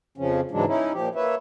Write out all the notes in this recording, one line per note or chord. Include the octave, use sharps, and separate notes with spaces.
F2 C#3 F3 C#4
G#2 C#3 E3 F#3 G#3 D4
C#4 D#4 E4
A#2 F3 G4
A#3 B4 C#5 E5